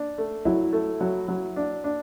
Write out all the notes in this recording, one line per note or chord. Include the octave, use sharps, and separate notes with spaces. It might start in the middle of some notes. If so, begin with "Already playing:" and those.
Already playing: D4
A3
F#3 E4
A3
F#3
F#3
D4
D4